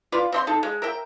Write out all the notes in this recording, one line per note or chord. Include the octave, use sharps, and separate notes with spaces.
F4 B4 D5
C4 D#5 C6
D#4 A4
G#3
A#4 E5 G5